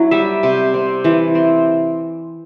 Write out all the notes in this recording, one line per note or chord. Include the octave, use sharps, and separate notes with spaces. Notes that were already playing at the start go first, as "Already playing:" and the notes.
Already playing: F#3 E4
G3 E5
C3
C4
E3
C4